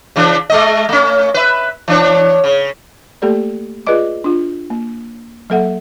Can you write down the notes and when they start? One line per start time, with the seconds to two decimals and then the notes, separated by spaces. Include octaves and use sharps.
0.16 C#3 E3 D4
0.50 G#3 A3 D#5
0.89 A3 C#4
1.34 B4 E5
1.88 E3 D4 C#5
2.44 C#3
3.22 A3 A#3 G4 A4 D5
3.87 F4 G#4 B4 D5 D#5 D6
4.24 D4 F4
4.70 A#3
5.50 F#3 A#3 A4 E5 F#5